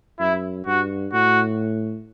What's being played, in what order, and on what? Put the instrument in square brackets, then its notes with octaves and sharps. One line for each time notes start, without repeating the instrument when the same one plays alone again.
[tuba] F#2 [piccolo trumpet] E4
[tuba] G2 [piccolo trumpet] F#4
[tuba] A2 [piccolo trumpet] F#4